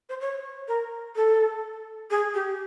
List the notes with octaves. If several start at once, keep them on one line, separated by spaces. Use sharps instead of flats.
C5
C#5
A#4
A4
G#4
G4